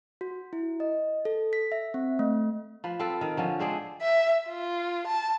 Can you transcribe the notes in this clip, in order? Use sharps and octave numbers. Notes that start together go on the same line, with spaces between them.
F#4
E4
D#5
A4
B6
E5
C4
A3
F3 B4
C4 F4 A4 B4
D#3
D3 F3 C#4
G#3 C4 D4 G#4
E5
F4
A5